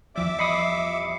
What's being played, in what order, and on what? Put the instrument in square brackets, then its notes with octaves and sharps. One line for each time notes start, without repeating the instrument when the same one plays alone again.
[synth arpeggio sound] E2 F3 G3 [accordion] E5 D6
[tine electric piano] D#5 B5 D#6 [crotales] C7 C#7